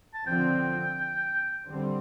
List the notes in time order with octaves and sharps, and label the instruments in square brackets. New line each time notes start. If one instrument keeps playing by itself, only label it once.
[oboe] A5
[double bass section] D3 F3 C4 [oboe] G5
[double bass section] D3 G3 C4